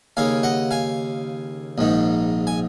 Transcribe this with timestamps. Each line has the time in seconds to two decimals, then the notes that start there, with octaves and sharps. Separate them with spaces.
0.17 D#2 C#3 F5 G#5
0.43 D#5 F#5
0.71 F5 G#5
1.78 A#1 G#2 D#3
2.47 G#5